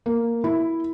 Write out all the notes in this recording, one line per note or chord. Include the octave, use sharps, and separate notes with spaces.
A#3
E4